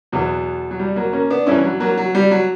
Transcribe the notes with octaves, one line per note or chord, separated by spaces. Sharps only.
E2 B2 F#3
F#3
G3
F#3 A#3
A#3 C#4
B3 D4
G2 E3 C#4 E4
F#3
F#3 A#3
F#3
G3
F#3